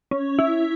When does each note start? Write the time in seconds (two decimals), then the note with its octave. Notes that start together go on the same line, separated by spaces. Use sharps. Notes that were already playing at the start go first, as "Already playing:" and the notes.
0.11 C#4
0.39 E4